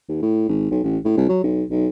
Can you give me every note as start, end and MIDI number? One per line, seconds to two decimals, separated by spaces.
0.09 0.19 39
0.22 0.44 45
0.49 0.70 32
0.70 0.83 35
0.83 0.97 33
1.05 1.15 45
1.17 1.25 36
1.29 1.43 54
1.44 1.63 35
1.71 1.87 35